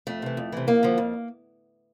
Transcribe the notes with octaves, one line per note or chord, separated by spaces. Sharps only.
F2 A3
C3 E3
F2
C3 E3
F2 A#3
D3 F3
F2